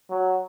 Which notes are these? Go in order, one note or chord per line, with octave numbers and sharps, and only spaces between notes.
F#3